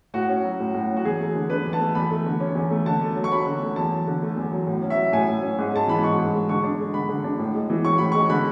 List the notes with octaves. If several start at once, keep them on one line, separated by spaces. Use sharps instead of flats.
A2 F#4
C#4
F#3
A2
A2
C#4
F#4
E2 G#4
A3
D3
D4 B4
E2
A5
A3
E2 B5
A3
D3
C#4
E2
A3
D3 A5
A3
F#3
C#6
C#4 B5
D3
A3
E2 A5
F#3
D3
A3
E2
F#3
A2
C#4
E5
F#3
A2 G#5
A2
C#4
G#2
G#3 A5
E3 B5
G#2 C#6
G#2
G#3
D3 C#6
D4
G#3
D3 B5
D3
D4
A2
G#3
E3
C#4 C#6
A2 B5
G#3 C#6
D3 B5